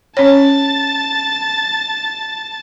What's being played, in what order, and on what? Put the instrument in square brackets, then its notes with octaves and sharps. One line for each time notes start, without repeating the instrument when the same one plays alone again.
[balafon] C#4 C#5 [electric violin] A5 A6